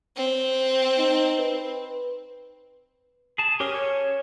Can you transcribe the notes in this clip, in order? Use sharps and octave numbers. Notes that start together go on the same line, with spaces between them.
C4
D#4
B4
G#4 A5
C#4 G4 G#4 A#4
C#5